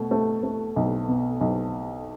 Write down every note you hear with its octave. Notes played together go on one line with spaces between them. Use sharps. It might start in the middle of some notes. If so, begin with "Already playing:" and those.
Already playing: B2 A3
A3
A3
B1
B2
B1